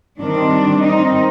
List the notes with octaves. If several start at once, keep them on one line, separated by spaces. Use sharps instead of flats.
D#3 G3 C4 D4
D#3 G3 C4 D#4